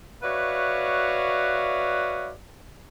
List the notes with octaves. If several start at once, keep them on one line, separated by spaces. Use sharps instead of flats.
F#4 B4 C#5 D5 E5 F5